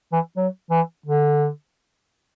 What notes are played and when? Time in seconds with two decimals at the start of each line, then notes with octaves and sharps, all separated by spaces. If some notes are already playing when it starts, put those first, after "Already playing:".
0.13 E3
0.37 F#3
0.70 E3
1.06 D3